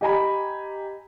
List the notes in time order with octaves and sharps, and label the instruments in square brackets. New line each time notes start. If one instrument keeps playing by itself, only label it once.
[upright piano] G4 D#5 G#5 A#5 B5